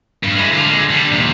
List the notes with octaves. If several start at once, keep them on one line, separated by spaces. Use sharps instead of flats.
G2
G#3 E4
D3 F4
D3 G#3
D3 G3
D#2 C3